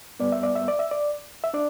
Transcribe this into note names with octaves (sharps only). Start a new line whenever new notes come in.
G2 G3 B3 D5
E5
D5
E5
D5
E5
D5
E5
D4 D5